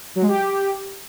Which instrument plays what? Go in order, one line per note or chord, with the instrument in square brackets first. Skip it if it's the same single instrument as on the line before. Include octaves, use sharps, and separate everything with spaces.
[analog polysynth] F#3
G#3
G4